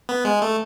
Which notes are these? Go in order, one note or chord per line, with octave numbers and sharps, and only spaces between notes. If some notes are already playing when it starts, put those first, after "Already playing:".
B3
G#3
A3